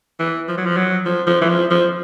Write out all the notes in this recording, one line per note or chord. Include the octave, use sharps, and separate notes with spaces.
E3
F3
F#3
F3
F#3
F3
F3
E3
F3
F3